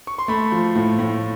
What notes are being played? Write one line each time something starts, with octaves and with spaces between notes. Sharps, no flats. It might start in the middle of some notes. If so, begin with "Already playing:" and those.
C#6
C6
A3 B5
F3
A2
A2